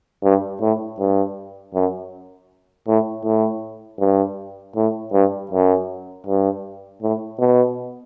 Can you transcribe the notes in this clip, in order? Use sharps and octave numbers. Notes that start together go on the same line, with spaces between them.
G2
A2
G2
F#2
A2
A2
G2
A2
G2
F#2
G2
A2
B2